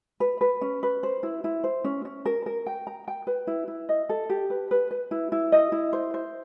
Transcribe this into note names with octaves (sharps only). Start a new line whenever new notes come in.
B4
B4
C#4
B4
C5
E4
E4
C5
C#4
C#4
A#4
A#4
G5
A#5
G5
B4
E4
E4
D#5
A4
G4
B4
B4
B4
E4
E4
D#5
E4
C5
C5